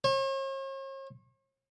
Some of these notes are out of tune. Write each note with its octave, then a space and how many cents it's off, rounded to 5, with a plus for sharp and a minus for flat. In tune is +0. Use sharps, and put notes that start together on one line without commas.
C#5 -45